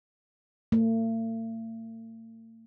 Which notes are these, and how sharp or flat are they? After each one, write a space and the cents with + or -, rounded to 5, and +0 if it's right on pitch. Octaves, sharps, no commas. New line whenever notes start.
A3 +45